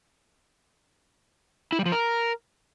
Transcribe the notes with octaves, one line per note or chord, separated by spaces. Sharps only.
E4
G3
F3
A#4